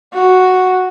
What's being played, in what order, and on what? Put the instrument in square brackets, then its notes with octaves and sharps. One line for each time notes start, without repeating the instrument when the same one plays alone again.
[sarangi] F#4